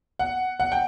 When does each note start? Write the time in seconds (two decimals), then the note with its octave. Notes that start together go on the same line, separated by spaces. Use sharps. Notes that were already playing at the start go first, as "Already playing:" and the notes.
0.19 F#5
0.60 F#5
0.72 G5